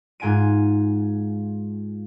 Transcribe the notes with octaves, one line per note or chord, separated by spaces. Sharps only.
G#2 F4 G#5 D7 D#7